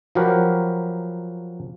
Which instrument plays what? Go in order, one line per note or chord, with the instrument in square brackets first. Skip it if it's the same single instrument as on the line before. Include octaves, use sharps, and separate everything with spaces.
[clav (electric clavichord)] F3 F#3 F#4 G4 A#4 B4